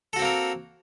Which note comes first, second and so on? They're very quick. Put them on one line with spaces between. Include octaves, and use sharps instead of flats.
A4 F#4 C4 A#3 A#4